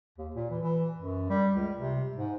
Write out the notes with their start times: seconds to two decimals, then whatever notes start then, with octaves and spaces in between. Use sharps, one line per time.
0.18 D#2
0.35 A#2
0.50 E3
0.63 E3
0.97 F#2
1.30 G3
1.55 C#2
1.76 C3
2.16 G#2